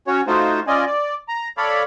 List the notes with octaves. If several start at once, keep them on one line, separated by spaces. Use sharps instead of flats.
C#4 F#4 C#5
A3 D#4 F4 F#4 C5
C#4 F4 D5 D#5 G#5
D5
A#5
A4 C#5 D5 F5 B5